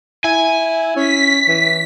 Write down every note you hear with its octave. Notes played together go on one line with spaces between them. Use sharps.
E4 G#5
C#4 B6
E3